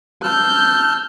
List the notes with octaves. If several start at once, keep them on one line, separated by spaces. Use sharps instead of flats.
A5 E6 F6 G6